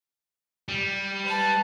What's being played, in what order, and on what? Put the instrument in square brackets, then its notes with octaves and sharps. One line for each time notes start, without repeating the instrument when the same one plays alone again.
[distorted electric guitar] G3
[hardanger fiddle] B4 A5